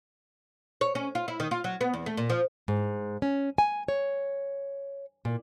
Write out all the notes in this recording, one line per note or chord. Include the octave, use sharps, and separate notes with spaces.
C#5
C#4
F4
E4
D#3
F4
F#3
B3
E2
A3
A#2
F3
G#2
C#4
G#5
C#5
A#2